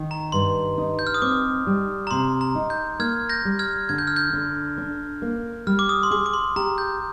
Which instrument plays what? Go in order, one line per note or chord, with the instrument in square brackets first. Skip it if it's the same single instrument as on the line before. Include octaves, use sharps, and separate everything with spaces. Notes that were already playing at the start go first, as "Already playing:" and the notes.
Already playing: [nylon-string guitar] D#3
[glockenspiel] A#5
[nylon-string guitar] G2 [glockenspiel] C6
[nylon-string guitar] D#4
[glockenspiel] G6
F6
D#6
[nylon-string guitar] C4 [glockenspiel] D6
[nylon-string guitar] G3
[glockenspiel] A#5
[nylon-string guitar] C3 [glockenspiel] C6
[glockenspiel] A#5
[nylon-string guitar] D#4
[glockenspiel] G6
[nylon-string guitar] A#3 [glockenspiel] F6 G#6
[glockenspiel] G6 A#6
[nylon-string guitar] G3
[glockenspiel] F6 G#6
[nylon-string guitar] D3 [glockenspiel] G#6
[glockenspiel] G6
F6
G6
[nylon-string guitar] D3
D4
A#3
[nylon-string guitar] G3 [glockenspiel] F6
[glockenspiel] D6
D#6
C6
[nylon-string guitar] G#4 [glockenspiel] D6
[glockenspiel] D6
C6
[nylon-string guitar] G4 [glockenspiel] A#5
[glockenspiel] G6